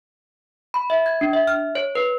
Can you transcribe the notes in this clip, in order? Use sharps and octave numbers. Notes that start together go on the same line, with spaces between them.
B5
E5
G#6
D4
E5
F6
C#5
B4